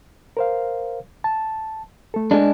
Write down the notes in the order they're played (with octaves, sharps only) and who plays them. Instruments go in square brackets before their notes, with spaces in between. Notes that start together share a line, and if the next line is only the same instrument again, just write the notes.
[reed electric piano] A#4 C5 F5
A5
A3 A4
[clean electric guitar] G#3 D4